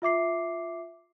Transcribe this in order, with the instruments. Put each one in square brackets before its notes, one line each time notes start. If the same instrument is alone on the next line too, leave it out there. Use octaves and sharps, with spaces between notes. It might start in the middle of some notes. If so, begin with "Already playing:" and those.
[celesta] F4 E5 D6 C7